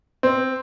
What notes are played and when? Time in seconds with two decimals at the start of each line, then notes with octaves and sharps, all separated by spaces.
0.23 C4